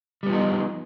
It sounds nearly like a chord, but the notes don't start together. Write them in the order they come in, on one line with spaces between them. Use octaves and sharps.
G3 B3 F3 D#4